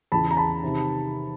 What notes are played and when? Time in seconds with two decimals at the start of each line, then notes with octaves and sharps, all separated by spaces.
0.12 E2 C#3 E3 A5 B5
0.31 A#5
0.37 A5 B5
0.63 C3 D#3